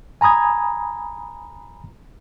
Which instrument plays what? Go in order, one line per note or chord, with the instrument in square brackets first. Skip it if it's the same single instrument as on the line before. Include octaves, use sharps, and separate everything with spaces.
[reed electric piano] G#5 A#5 B5 D#6 G#6